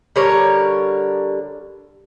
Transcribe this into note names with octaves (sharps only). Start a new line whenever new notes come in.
D3 G3 A#4 C#5